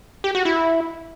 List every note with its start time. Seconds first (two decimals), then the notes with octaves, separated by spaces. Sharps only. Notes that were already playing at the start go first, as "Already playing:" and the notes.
0.24 G4
0.35 F#4
0.45 E4